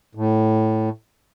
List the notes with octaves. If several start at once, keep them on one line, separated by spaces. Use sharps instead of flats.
A2